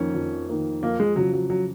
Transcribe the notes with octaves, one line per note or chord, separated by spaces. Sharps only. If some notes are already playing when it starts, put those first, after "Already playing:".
Already playing: F2 D#3 A#3 C#4
F2
D#3 A#3
F2 A#3
G#3
C#3 F3 F#3
F#3
F#3